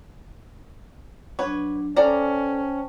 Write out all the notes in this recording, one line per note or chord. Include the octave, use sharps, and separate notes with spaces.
F#3 D4 B4 C#5
C#4 A4 C5 D5 G5 A5 A#5